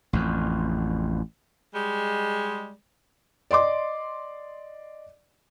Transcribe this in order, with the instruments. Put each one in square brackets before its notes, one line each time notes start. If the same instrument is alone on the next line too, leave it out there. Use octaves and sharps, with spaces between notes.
[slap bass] A1 F2
[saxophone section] G3 G#3
[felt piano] D5 D#5 C6 D6